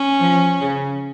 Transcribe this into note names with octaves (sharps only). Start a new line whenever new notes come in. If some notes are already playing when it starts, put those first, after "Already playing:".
Already playing: C#4
F3
C#3